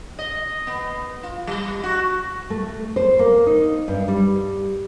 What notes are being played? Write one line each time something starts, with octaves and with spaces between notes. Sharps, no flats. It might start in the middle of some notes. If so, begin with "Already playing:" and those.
D#5
B3
F4
G3
F#4
A3
C5
A#3
D#4
G2
G3